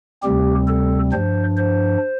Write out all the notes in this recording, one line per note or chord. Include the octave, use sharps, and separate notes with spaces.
D2 C3 G3 C4 G4
A4
G2 F3 D4 C5
C5